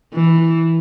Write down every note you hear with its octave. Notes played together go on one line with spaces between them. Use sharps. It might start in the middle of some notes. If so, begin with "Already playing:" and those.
E3